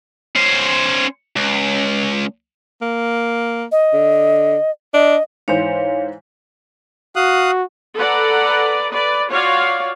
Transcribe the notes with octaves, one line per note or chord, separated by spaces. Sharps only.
C#4 C5
C#2
A#3
D#5
D3
D4 D#5
G#2 E3 C5 C#5 F5
F#4 F5 D#6 F#6
A4 B4 D5 F#5 A#5
B4 D5
F4 F#4 C#5 D5 F5